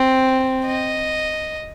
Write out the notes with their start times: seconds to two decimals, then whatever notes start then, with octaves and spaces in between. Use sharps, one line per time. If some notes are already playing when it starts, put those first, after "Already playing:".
Already playing: C4
0.67 D#5